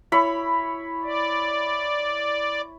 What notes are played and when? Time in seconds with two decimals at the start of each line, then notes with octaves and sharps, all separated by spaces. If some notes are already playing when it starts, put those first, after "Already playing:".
0.12 E4 C#5 B5
1.03 D5